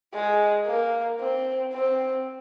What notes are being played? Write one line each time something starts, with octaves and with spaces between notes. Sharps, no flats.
G#3
A#3
C4
C4